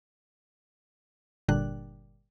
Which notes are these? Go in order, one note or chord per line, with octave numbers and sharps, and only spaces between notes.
G1 A#2 D3 G3 D4 F#6